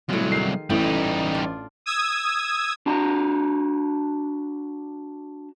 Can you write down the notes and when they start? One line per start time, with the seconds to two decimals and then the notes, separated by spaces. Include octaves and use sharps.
0.09 C2 A2 F#3 F4
0.32 D#3 G#4 C7
0.70 A1 A2 G3 D#4
1.35 D4 F4
1.86 D#6 E6 G#6
2.86 D4 F#4 A#5